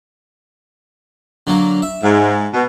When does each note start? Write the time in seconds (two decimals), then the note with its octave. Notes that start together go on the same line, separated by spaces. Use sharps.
1.47 D3 F#3 A#3
1.82 E5
2.03 G#2
2.53 B2